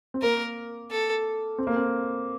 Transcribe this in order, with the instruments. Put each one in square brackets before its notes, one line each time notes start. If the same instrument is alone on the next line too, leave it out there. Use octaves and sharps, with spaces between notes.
[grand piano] C4
[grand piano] A#3 [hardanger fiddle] A#4
[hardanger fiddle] A4
[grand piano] C4
A#3
C4